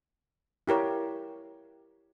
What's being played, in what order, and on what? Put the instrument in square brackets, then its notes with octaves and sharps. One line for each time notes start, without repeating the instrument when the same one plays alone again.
[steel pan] E4 G4 A#4 C#5